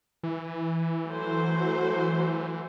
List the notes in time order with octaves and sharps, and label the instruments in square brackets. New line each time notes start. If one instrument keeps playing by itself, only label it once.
[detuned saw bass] E3
[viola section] F#3 A3 C5